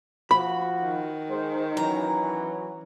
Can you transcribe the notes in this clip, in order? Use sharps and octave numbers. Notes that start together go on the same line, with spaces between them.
F3 F#4 B5
D#3
G#3 C5
E3 F#3 C#4 A#5